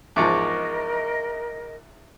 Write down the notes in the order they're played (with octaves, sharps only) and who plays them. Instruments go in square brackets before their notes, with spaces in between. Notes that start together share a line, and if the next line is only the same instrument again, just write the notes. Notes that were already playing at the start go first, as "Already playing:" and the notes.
[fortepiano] E2 G#2 F3 [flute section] A#4 D#5 [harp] C#6 D6